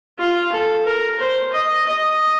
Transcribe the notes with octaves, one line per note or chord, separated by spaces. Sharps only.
F4
A4
A#4
C5
D#5
D#5